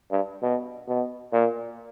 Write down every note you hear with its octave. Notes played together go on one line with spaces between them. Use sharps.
G2
B2
B2
A#2